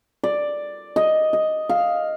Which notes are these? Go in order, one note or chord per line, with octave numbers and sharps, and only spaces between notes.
D5
D#5
D#5
F5